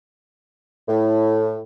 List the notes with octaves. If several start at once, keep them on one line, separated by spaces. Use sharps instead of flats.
A2